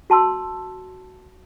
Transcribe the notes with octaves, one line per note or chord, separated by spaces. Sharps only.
F#4 A5 C6 E6